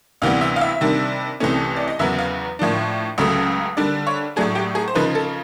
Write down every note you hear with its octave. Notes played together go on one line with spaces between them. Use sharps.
D2 C3 E3 G3 B3 F5
E5
F5
E5
C3 D#3 G3 A#3 D4
C2 C3 E3 A3 C#4
D5
D#5
E2 C#3 F#3 B3 E5
F5
A2 F3 A#3 D4
C#2 C#3 F#3 A3
D3 G3 A#3 D4 D5
C#5
A2 F#3 A3 D4 G#4
G4
G#4
C5
C#3 F3 A#3 D#4 B4
A4